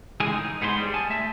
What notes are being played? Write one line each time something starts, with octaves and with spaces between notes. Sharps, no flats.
C#2 A2 E3 G#3 G#4 G#5
D#4
G#2 B3 G#4 C5 D5 C6
G3 G#4
G#5 A5
A3 E5 A5